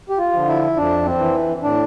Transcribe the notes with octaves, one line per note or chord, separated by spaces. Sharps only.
G4
F4
D3 F3
E4
F2 D4
C4
E3
A2 D4